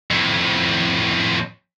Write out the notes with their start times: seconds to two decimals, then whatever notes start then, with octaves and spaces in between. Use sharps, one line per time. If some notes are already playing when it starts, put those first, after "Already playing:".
0.11 F2 A2